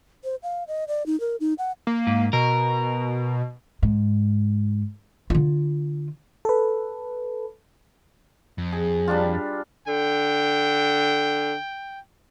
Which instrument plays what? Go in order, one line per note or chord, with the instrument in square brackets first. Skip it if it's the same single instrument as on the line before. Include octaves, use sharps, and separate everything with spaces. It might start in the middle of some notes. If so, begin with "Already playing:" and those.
[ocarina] C5
F5
D#5
D5
D#4
A#4
D#4
F#5
[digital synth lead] A#3
[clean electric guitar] G#2
[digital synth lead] B2 [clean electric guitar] A#4
[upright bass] G#2
D3 F4
[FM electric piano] A4 B4
[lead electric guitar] F2
[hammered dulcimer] G#4
G3 D4 F4
[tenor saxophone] D3 [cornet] G5